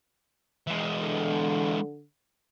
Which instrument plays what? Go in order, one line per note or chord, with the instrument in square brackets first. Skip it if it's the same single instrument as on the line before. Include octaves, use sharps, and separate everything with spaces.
[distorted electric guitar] E3 G#3
[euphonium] D3